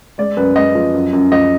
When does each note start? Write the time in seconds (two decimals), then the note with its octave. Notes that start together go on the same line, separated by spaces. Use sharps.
0.18 G#3 D5
0.37 F#2 B4
0.56 G#3 D#5
0.75 F3
0.94 F#2
1.13 F#2
1.32 F3 D#5